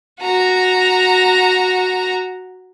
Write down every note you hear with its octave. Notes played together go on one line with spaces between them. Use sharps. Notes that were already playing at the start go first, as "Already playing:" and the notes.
F#4 A#5